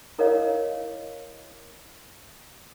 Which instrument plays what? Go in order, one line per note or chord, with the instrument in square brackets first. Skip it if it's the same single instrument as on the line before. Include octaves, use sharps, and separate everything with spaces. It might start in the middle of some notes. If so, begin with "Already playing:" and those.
[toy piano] E4 A#4 C#5 D#5 F5